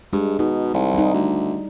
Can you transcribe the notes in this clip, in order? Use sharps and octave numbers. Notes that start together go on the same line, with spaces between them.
G2 G#3
B2 D#4
C2 E4
G3 D#4
D2